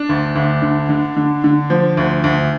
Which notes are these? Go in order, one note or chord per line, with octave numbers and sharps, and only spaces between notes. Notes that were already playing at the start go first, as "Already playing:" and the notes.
Already playing: D4
D2
D2
D3
D3
D3
D3
F3
D2
D2